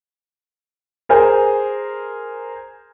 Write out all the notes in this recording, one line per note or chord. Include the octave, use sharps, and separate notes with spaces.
G#4 A#4 C5 G#5